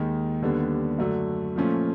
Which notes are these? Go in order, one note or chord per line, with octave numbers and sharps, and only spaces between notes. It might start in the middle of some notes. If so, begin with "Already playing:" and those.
Already playing: D#2 D#3 G#3
D#2 D3 G3 B3 D4
F#2 D3 F#3 A3
A#2 F3 A3 C#4 F4